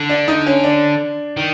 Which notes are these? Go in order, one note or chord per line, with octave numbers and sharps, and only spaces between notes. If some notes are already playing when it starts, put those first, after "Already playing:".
Already playing: D3
D4
D#4
C#4
D4
D#3